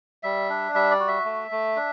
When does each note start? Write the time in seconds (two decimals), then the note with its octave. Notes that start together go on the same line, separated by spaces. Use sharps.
0.23 G3 E5
0.49 D4
0.74 G3 E5
0.91 D5
1.00 F#4
1.08 E5
1.25 A3
1.51 A3
1.76 D4